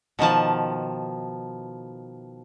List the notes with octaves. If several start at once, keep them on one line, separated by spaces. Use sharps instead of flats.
B2 D#3 F3 A5